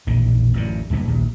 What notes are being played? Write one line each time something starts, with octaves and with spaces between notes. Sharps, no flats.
E1 A#1 A#2 D#3
A1 F#2 D3
D1 G2 A#2 B3
A#1 D#2